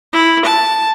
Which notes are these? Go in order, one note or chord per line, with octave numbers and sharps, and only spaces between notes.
E4
A5